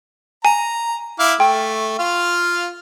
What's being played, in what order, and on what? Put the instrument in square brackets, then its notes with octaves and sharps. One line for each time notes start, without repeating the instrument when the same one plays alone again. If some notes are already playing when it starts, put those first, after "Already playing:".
[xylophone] G#5 [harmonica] A#5
[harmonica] E4 F5 D6
[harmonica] A3 [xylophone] G5
[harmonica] F4 F5